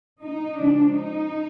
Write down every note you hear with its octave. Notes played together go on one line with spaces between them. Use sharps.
D#4
C#3 F3 G#3 D4
D#4